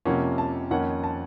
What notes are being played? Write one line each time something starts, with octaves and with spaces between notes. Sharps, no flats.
F2 C3 F3 A#3 C#4 F#5
A5
F2 D#3 A#3 C#4 F#5
A5